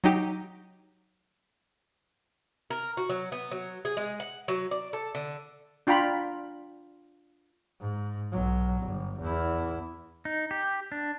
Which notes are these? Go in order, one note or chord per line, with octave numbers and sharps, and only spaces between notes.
F#3 D#4 G4
A#4
F#4
F#3
B3
F#3
G#4
G#3
F#5
F#3
D5
A4
D3
D4 F4 G5 A#5 B5
G#2
B1 F#3
G1
E2 E4
D#4
G4
D4